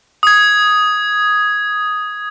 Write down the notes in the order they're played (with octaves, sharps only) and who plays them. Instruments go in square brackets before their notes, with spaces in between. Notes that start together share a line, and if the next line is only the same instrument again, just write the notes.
[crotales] D#6 G#6